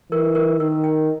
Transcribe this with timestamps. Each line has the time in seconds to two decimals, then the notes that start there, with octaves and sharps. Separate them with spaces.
0.11 E3 A#4
0.35 A#4
0.60 D#3 A#4
0.84 G5